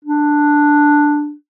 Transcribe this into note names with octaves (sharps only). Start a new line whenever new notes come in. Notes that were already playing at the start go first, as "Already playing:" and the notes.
D4